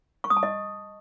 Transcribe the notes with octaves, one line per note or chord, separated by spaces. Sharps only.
C#6
D#6
A5
D#5